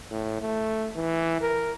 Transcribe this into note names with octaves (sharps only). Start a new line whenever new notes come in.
A2
A3
E3
A#4